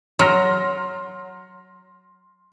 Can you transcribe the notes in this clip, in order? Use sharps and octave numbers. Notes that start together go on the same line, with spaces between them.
F#3 C6 F6 A#6